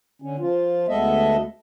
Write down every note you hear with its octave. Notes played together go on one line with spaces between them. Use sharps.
D3 C#4
F3 F4
D2 G#3 B3 A4 D#5 E5